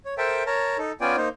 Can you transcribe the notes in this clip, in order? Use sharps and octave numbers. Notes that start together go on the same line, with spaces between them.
C#5
A4 A#4 C5 E5 G5 A5
A#4 C#5 A5 A#5
D#4 A4
B3 C#4 F4 D5 G5 G#5
A#3 D#4 C5